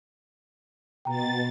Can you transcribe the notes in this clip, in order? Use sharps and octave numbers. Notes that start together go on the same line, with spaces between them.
B2 G5 A#5 A6